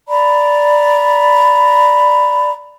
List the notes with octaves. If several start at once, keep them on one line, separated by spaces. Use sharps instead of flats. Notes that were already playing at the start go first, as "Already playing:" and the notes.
D5 A#5 B5